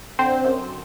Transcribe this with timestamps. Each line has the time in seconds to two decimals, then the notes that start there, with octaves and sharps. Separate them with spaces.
0.19 D3 C4 C5
0.45 F#2